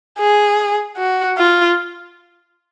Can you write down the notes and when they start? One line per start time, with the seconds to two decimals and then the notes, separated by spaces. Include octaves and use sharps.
0.19 G#4
0.98 F#4
1.38 F4